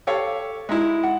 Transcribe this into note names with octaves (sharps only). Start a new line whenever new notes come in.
G4 A4 C#5 F5
G#3 D#4 E4
F#5